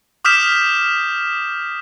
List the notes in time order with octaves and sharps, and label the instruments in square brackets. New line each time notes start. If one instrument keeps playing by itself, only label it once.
[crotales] D6 D#6 F6 G6 B6 E7